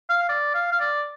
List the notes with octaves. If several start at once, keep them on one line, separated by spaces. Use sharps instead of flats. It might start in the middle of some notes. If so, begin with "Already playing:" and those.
F5
D5
F5
F5
D5